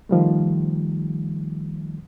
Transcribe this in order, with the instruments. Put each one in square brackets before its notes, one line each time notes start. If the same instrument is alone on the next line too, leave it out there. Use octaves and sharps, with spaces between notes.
[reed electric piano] D#3 F3 G3 A3